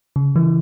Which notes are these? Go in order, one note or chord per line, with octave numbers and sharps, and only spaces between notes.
C#3
E3